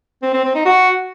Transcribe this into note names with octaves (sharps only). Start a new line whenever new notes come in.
C4
C4
C4
D#4
F#4